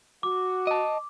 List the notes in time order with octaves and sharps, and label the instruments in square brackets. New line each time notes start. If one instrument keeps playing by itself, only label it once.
[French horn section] F#4 [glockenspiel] D6
[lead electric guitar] D#5 A5